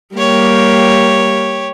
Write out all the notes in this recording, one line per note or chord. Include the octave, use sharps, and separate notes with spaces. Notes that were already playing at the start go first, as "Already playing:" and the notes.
G3 A#3 G4 C#5